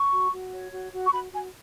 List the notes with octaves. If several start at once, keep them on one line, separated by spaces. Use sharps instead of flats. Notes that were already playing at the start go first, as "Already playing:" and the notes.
Already playing: C#6
F#4
F#4
C#5
F#4
F#4
C#6
F#4 B5
F#4 G#5